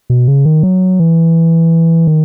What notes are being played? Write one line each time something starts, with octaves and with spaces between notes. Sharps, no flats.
B2
C#3
D#3
F#3
E3
D#3